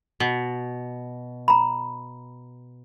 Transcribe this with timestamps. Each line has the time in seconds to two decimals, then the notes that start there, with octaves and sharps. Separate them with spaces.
0.20 B2
1.48 A#5 B5